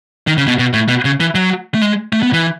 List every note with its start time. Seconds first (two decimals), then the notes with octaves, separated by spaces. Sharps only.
0.27 D#3
0.38 C#3
0.48 B2
0.59 B2
0.73 A2
0.89 B2
1.05 C#3
1.20 E3
1.35 F#3
1.74 A3
1.81 G#3
2.13 A3
2.23 B3
2.33 E3